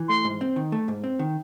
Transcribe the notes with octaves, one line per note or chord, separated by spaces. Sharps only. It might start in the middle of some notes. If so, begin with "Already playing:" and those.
Already playing: E3
A3 C6
G#2
C4
D#3
A3
G#2
C4
D#3